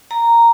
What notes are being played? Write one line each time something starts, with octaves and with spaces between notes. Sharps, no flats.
A#5